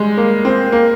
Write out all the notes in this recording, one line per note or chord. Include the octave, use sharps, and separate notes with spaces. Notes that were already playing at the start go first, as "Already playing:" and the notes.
Already playing: G3 G#3
A#3
C4
A#3